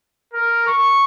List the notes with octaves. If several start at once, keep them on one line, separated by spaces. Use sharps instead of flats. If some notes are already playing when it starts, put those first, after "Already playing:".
A#4
C#6